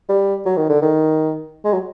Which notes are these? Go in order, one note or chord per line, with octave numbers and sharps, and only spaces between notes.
G3
F#3
D#3
D3
D#3
G#3
F#3